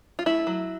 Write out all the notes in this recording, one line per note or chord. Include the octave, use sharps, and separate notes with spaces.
F4
A3 E4
F#3